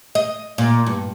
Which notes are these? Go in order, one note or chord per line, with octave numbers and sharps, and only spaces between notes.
D#5
A#2
G2